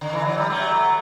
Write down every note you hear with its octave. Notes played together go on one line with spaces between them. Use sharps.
D3
E3
F#3
G3
F#3 A3